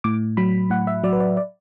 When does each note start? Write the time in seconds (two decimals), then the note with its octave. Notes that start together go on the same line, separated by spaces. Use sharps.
0.04 A2 D6
0.37 F#3 B5
0.70 A2 F#5
0.87 E5
1.04 F#3 D5
1.13 B4
1.20 D5
1.37 D5